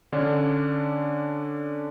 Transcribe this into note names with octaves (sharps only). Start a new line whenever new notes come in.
D3 C#4 D4